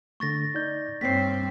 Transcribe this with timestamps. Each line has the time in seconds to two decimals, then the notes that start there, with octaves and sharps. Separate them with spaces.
0.20 D3 A3 C#6 A6 A#6
0.55 D#4 D5 G6
1.01 G2 A#3 C4 C#5 B6 C7